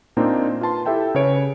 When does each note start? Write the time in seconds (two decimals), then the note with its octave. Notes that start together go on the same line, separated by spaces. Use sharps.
0.17 A#2 A#3 C4 D4 D#4 F4
0.61 F4 B4 A5 C6
0.85 E4 G4 A4 E5 G5 A5
1.15 C#3 B4 C#5 D7